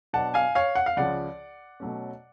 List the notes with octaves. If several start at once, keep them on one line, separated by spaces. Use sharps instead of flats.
B2 F#3 B3 D4 F#5 A5
F5 G#5
C#5 F5
F#5
F5
C#2 C#3 F3 D5 F#5
B2 F#3 A3 C#4